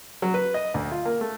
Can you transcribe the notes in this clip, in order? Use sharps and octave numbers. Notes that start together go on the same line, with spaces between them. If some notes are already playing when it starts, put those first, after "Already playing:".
F#3
B4
D#5
D2
F4
A#3
A3